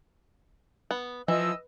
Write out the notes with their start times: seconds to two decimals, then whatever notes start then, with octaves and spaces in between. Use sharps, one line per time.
0.91 B3
1.28 E3 F3 D#5 E6